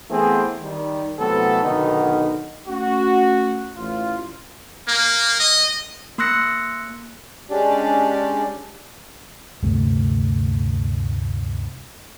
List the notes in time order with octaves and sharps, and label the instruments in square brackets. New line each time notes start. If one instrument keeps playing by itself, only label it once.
[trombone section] E3 A3 B3 C4 G#4
D#3 G3
C2 F#3 A3 B3 C4 A4
B1 D3 D#3 B3 D#4
[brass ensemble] A3 C#4 F#4
A1 F4
[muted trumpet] A#3
D#5
[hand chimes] A#3 C6 E6 F#6 A#6 C#7
[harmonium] G#3 C#4 D4 G4 D5
[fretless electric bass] D2 G2 C3 A3